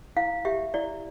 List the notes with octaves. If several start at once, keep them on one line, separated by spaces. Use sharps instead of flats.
E4 F5
G4 E5
E4 D5